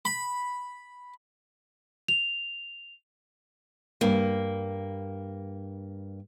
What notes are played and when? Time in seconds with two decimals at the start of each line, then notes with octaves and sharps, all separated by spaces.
0.05 B5
2.08 F7
4.01 G2 A#3